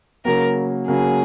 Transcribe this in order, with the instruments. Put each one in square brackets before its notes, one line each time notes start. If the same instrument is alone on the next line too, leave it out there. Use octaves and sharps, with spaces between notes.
[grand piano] C#3 F#3 A#3 [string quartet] A#4
[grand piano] C#3 F#3 A#3 [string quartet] G#4